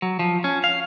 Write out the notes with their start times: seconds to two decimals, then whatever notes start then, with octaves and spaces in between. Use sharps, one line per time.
0.02 F#3
0.19 F3
0.44 C#4
0.64 F5